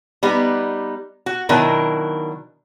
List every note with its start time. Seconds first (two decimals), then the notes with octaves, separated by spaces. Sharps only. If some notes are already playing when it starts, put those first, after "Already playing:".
0.23 G3 B3 D#4
1.26 F#4
1.49 B2 D#3 F#3 D4 E4 A#4